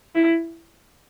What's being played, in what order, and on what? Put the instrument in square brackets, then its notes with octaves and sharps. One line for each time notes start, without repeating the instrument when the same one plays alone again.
[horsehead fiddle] E4